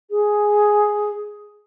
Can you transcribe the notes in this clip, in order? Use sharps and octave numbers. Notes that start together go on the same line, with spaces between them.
G#4